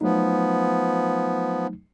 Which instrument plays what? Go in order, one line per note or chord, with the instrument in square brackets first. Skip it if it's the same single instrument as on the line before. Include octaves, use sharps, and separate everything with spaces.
[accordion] F3 B3 [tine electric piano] F#3 A3 D#4